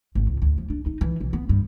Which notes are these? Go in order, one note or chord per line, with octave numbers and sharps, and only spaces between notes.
G#1
C#2
D2
F3
D4
D#4
E3
B1
B3
G2